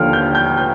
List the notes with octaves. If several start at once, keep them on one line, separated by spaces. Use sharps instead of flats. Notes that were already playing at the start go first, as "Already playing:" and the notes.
Already playing: D#2 D3 F3 F6
G6
G6
G6